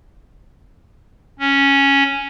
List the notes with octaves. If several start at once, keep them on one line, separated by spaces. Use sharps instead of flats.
C#4